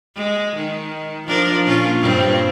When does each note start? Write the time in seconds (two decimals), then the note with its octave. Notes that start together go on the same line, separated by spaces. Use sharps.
0.16 G#3
0.55 D#3
1.27 F3 D4 A#4
1.65 A#2 C#4 F4
2.01 G2 A#2 C4